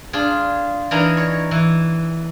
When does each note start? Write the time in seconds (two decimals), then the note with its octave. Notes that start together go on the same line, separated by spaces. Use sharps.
0.13 D4 F4 G#4
0.91 E3 D4 D#4 A#4 G#5 A#5
1.17 C#5
1.51 E3